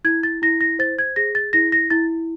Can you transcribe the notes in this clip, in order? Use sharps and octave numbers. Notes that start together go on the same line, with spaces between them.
E4 G#6
A6
E4 A#6
A#6
C5 A6
G#6
G#4 A#6
A6
E4 A#6
A#6
E4 A6